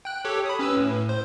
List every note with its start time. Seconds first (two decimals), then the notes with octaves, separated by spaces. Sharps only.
0.05 G5 F#6
0.25 G4 A4 C#5
0.46 B5 D#6
0.59 C#4 B4 E6
0.76 A2
1.09 C5